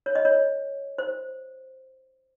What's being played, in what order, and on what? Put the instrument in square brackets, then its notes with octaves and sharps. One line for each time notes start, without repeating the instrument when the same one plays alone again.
[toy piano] C#5
D#5
C#5
C5